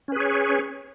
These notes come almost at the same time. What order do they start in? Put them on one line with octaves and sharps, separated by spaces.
C#4 B4 G#4 C#5